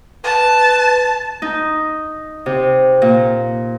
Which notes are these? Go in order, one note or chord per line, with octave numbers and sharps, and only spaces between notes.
B4 A5
D#4
C3
A#2